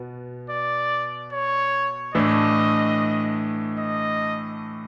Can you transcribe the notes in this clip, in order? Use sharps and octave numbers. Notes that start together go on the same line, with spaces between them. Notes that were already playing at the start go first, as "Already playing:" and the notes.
Already playing: B2 B3
D5
C#5
A2 E3 A3 D4 D#5
D#5